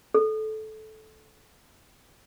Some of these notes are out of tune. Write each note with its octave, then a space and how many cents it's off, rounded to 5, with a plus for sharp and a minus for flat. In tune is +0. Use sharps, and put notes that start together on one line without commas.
A4 -15